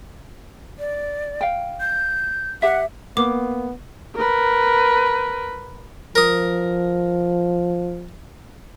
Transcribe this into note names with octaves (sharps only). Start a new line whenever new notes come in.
D5
F5 G5
G6
G4 E5 F#5
A#3 B3 D6
A#4 B4
F3 A#4 D#6